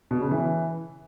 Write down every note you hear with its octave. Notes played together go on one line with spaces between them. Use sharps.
B2
C#3
E3